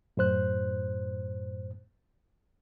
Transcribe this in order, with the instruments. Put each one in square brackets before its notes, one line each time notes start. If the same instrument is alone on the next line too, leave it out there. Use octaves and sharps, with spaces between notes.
[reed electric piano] F#2 A2 C5 F#6